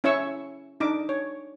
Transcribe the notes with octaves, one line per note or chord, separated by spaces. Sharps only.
C#4 E4 C#5 E5 C#6 E6
D4 D#4 D6
C#5